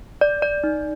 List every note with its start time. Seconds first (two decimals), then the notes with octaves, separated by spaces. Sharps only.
0.21 D5
0.42 D5
0.64 D#4